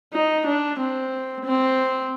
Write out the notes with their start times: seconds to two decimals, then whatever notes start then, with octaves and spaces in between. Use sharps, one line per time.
0.13 D#4
0.46 D4
0.79 C4
1.45 C4